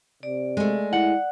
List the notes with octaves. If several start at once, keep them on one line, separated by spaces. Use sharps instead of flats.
C3 D5
G#3 A3
E4 F#5